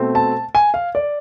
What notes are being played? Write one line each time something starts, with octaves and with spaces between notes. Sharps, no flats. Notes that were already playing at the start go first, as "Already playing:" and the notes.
Already playing: B2 A3 C4
A5
G#5
F5
D5